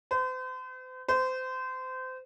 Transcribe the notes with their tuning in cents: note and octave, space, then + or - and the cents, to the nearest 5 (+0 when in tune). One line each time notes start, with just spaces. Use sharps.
C5 -40
C5 -25